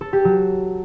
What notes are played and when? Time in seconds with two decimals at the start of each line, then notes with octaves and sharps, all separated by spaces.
0.01 A4
0.13 G4
0.25 F#3